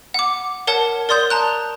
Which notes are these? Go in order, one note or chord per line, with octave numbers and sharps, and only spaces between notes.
F#5 D6
A#4 C#5 F#5 A5
A#4 D5 C6 D#6 G6
A5 A#5 F#6